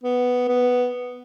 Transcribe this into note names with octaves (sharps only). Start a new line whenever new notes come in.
B3
B3